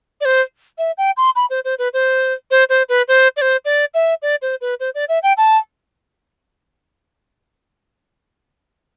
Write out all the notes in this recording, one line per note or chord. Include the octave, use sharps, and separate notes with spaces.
D5
C5
E5
G5
C6
B5
C5
C5
B4
C5
C5
C5
B4
C5
D5
C5
D5
E5
D5
C5
B4
C5
D5
E5
G5
A5